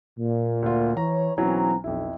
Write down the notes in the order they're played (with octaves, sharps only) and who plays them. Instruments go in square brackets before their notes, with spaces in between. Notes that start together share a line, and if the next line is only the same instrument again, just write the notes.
[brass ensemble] A#2
[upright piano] D2 F4
[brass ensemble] E3 C#5 [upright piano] A#5
[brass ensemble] B1 C4 A#5 [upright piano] E3 F#3 C#4
[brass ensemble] B1 [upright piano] F2 E4